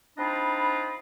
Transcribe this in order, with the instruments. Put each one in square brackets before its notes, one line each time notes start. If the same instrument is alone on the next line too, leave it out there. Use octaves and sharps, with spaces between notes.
[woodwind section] C4 D4 D#4 F4 D#5 B5